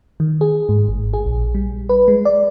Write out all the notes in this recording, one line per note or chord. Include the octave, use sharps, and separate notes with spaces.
D#3
G#4
G#2
G#1
G#4
A#1
G3
B4
G#3
D5